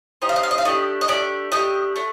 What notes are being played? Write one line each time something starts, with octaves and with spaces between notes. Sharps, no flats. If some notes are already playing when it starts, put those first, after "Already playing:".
C4 D#4 G4 D#5
F5
D#5
F5
D#5
F5
A3 D4 G4 D#5
D#5
A3 D4 G4 D5
A3 D4 G4 D#5
A3 D4